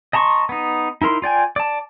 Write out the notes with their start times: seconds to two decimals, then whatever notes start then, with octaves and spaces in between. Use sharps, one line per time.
0.13 D#5 A5 A#5 C6 C#6
0.49 B3 D#4
1.02 D#4 E4 A#4 C6
1.22 F4 D5 G5 G#5
1.56 D5 A5